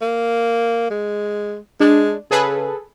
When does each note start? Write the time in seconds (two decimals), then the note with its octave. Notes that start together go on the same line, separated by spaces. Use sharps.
0.01 A#3
0.90 G#3
1.80 G#3 D4
2.31 C#3 G#4 A4 B4